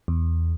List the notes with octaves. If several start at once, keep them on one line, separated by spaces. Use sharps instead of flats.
E2